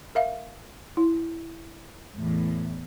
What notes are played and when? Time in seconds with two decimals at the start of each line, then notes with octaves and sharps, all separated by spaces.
0.15 A#4 E5 F5
0.97 E4
2.16 E2 A2